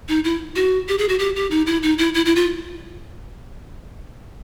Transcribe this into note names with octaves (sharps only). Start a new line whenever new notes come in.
D#4
E4
F#4
G4
G#4
F#4
G4
G4
D#4
E4
D#4
E4
E4
E4
F4